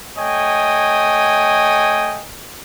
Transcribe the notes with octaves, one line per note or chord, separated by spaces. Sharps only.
A3 C#5 D#5 G5 G#5